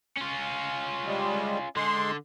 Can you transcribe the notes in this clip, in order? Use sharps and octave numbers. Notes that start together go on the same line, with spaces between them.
C#4 F4
G3 G#3
D3 G#3 C6